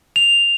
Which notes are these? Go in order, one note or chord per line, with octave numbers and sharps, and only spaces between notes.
F7